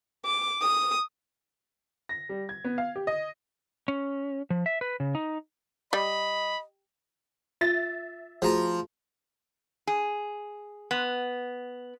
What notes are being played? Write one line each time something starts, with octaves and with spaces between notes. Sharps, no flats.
D6
D#6
A#6
G3
G#6
B3
F5
G4
D#5
C#4
F3
E5
B4
C#3
D#4
G3 D#5 B5
F4 E5 A6
F3 A3 F#4 G#4 A#5
G#4
B3